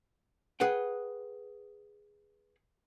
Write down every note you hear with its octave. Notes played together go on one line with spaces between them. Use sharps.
G#4 B4 F#5 G5